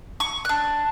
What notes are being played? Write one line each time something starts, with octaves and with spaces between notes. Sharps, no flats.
C#6
D4 F#6